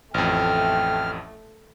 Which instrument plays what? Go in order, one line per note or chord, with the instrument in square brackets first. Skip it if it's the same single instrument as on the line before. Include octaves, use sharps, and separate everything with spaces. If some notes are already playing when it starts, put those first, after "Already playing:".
[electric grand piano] A1 F2 [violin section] A3 [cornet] G5 [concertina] F6